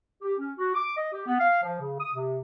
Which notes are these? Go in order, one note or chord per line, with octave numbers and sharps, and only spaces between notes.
G4
C#4
F#4
D6
D#5
G4
B3
F5
F3
C#3
D#6
C3